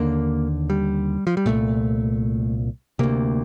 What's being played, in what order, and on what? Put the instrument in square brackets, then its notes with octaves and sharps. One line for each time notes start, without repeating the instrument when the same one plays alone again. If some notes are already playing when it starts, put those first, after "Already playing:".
Already playing: [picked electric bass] D#2 D3 A#3
G3
F3
G3
C2 A#2 A3
D2 C3 A#3